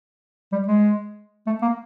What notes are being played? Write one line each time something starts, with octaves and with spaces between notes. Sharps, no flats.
G3
G#3
A3
A#3